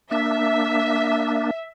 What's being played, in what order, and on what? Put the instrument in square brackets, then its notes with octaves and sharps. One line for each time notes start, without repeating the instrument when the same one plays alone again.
[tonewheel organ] A#3 D4 [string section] E5